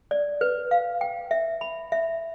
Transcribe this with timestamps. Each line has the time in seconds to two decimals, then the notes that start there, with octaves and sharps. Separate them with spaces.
0.11 D5
0.41 B4
0.71 F5
1.01 G5
1.31 E5
1.61 B5
1.92 E5